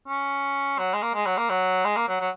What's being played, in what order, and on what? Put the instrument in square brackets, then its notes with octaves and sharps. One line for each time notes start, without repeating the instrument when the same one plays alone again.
[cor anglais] C#4
F#3
G#3
A#3
G#3
F#3
A#3
F#3
G#3
A#3
F#3
F#3